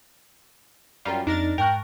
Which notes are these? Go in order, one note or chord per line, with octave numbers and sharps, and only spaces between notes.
F#2 G3 F4 A#4 A#5 D6
F2 C4 D4 D#4 A#4 A6
G#2 A#4 G5 A5 C#6 F#6